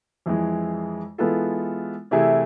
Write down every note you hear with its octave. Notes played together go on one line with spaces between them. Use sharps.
F2 E3 G#3
E3 G#3 B3 F4 A4
C3 E3 A3 E4 G#4